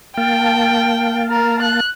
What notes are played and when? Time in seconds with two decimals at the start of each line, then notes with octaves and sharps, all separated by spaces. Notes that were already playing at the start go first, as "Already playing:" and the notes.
0.17 A#3 F5 G5 A5
1.31 A#4
1.62 F#6